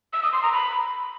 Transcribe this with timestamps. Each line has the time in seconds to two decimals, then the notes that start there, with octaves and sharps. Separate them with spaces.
0.13 E6
0.23 D#6
0.33 C6
0.43 A#5
0.52 B5